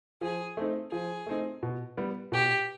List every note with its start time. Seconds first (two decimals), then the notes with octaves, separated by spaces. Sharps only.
0.21 F3 G#4
0.57 A3 C4 D#4
0.92 F3 G#4
1.26 A3 C4 D#4
1.63 B2
1.97 G3 B3
2.32 B2 G4